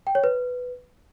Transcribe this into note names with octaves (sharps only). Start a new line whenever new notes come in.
G5
C#5
B4